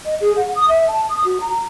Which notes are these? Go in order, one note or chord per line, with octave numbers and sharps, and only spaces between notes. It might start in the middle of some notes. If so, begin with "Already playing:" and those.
D#5
G#4
F#5
D#6
E5
A5
D#6
F#4
A#5